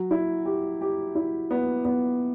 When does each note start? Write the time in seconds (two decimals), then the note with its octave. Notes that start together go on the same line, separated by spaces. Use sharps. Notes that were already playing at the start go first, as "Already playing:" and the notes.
Already playing: F#3
0.11 E4
0.45 G4
0.81 G4
1.15 E4
1.51 B3
1.85 B3